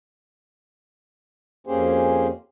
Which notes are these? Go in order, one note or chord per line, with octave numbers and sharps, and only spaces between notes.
F2 A#3 C#4 G4 G#4 C5